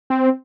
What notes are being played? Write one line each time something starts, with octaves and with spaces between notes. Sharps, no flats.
C4